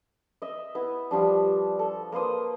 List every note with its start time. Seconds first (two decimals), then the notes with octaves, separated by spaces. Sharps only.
0.42 D#5 E5
0.75 B3 E4
1.11 F3 G3 D4
1.79 A4
2.12 A#3 B4 C5 D#6